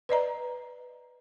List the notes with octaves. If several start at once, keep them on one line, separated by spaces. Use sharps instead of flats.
B4 D5 D#5 A#5